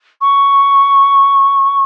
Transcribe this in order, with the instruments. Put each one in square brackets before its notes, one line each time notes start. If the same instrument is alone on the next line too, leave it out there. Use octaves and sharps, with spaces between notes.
[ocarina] C#6